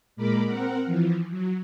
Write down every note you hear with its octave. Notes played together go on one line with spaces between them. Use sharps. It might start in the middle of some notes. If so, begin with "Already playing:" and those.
A#2 G#3 A#4 B5 D6
C4 A#4 F#5
E3 F3
F#3